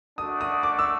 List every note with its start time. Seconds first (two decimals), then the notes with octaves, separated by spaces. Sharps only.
0.18 A3 D4 F#4 D#6
0.41 D#6
0.63 D6
0.79 E6